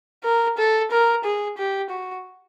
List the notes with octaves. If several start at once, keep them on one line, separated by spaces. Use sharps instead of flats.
A#4
A4
A#4
G#4
G4
F#4